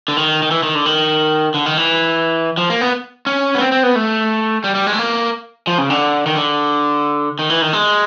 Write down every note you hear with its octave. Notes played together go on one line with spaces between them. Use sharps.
D3
D#3
D#3
E3
D#3
D3
D#3
D3
D#3
E3
F3
A#3
B3
C#4
B3
C4
C4
B3
A3
G3
G3
G#3
A3
A#3
F3
C#3
D3
D#3
D3
D#3
E3
D#3
G#3